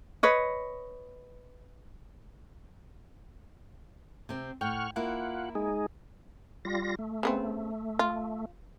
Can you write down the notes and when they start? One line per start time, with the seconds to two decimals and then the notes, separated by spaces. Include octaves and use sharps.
0.23 B4 C#5 D#5
4.29 C3 C4
4.61 A2 F#5 G5 C#6 F6
4.96 A#3 E4 F4 F#5
5.55 G#3 D#4 G#4
6.65 G3 F4 A#6
6.99 A3
7.23 C#3 B3 C4
7.99 F4